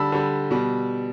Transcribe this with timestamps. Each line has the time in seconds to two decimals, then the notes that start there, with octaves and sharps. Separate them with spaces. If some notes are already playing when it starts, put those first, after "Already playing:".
Already playing: D3 G3 A5 B5 E6
0.12 D3 G3
0.51 B2 G3